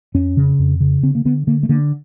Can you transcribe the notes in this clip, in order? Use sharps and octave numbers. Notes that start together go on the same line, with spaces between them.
F2 C#4
C#3
F2
C#3
D3 C4
A#3
D3 B3
D3 A#3
A3
D3 A#3